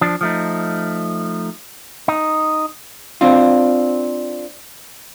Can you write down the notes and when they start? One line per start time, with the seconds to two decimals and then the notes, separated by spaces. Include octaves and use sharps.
0.01 F3 D4
0.21 F3 A3 D#4
2.08 D#4
3.21 C4 D4 F4